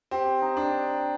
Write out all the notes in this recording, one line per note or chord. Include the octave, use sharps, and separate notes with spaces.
C4 G4
D#4
D4